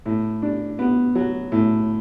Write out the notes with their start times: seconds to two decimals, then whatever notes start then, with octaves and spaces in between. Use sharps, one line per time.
0.06 A2
0.42 D4
0.79 B3
1.15 F#3
1.52 A2